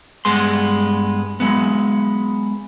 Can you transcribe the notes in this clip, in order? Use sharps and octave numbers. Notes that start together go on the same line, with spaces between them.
G2 G#3 B3 C6
F#3 G#3 B3